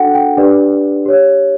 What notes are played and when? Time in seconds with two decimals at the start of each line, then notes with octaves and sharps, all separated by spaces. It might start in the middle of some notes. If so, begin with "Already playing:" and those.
Already playing: D4 F#4 A4 F#5 G5
0.15 G5
0.37 D4 G4 B4 D5
1.06 G4 C#5